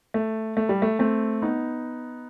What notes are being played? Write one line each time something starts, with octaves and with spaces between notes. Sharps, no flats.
A3
A3
G3
A3
A3 C4
B3 D#4